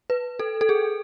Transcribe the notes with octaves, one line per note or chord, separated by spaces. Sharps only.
B4
A4
A4
G#4